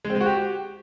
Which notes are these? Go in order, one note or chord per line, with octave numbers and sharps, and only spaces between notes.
G#3
C4
G#3
F#4
G4